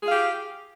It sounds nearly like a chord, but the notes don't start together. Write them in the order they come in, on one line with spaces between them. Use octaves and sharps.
G#4 F4 F5 G4